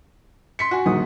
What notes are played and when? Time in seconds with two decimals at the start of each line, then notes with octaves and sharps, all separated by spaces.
0.59 C6 B6 C#7
0.71 F#4 G#5
0.86 A#1 D#3 D#6